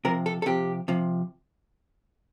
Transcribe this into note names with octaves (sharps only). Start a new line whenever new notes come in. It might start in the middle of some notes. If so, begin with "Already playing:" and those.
C3 F3 A#4
A4
A4
C3 F3 G4
C3 F3